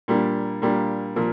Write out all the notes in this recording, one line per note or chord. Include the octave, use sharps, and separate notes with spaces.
A#2 G3 A#3 D4
A#2 G3 A#3 D4
A#2 F3 A#3